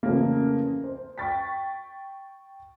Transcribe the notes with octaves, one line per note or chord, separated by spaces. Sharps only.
F2 C#3 E3 A3 A#3
C5
G5 C#6 A6 B6